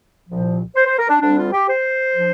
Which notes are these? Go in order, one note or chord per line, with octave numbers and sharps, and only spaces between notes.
C2 A#2 F3
C5
C5
A#4
D4
D2 D3 G3 C4 D4
F4
G4
C5
F3 D4